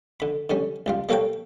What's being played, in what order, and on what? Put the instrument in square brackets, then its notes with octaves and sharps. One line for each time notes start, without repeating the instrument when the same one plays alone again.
[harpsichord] D3 B5
D3 G3 C#4
C#2 G3 F4
G3 A#3 A4 B4 C#5 G5